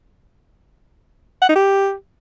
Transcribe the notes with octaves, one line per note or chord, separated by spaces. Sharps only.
F#5
D#4
G4